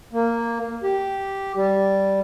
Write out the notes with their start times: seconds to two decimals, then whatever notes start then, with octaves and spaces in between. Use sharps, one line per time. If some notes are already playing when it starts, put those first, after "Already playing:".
0.13 A#3
0.83 G4
1.56 G3